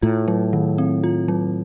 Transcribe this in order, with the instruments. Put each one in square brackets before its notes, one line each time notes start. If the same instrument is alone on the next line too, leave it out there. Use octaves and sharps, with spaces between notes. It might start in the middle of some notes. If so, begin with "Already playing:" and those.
[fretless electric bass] A2 [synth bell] F4
[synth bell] F#3
D#3
C4
F4
F#3